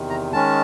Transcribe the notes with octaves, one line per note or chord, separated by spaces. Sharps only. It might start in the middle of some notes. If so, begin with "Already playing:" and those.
Already playing: E2 C3 D#3
A#5
D#3 G#3 C#4 A5